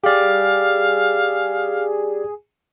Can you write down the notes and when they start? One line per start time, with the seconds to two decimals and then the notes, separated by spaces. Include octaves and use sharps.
0.04 G4 G#4 D5 F5